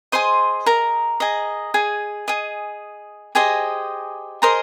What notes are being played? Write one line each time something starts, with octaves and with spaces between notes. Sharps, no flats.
G#4 C5 D#5 C6
A#4 A#5
G#4 D#5
G#4 G#5
G#4 D#5
G4 G#4 C5 D#5 G#5
G#4 A#4 C5 D#5 A#5